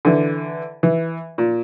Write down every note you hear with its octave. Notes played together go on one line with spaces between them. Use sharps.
D3 E3
E3
A#2